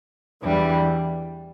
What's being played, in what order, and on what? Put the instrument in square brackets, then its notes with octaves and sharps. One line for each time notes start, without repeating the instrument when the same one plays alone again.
[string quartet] E2 E3 G3 D4